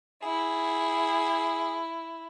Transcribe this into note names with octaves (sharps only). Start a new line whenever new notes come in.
E4 G#4